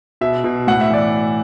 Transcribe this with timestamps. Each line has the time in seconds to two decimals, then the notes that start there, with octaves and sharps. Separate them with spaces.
0.21 B2 E5
0.44 B2
0.67 A2 F#5
0.81 E5
0.91 E3 D5